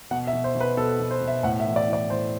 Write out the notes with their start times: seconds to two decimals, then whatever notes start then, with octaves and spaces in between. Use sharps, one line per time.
0.11 B2 F#5
0.27 E5
0.33 B2
0.44 C5
0.55 B2
0.61 B4
0.77 B2 A4
1.00 B2
1.11 C5
1.21 B2
1.28 E5
1.43 A2 F#5
1.60 E5
1.65 E3
1.76 D5
1.88 E3
1.93 D5
2.10 A2 C5